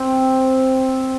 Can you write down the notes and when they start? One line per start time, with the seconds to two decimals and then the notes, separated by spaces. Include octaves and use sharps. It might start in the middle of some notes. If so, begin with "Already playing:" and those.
Already playing: C4